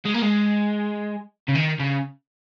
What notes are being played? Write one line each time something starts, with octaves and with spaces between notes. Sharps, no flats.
G#3
A#3
G#3
C#3
D#3
C#3